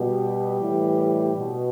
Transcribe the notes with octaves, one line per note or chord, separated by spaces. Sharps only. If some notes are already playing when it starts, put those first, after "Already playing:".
Already playing: B2 G3
A2 E3
B2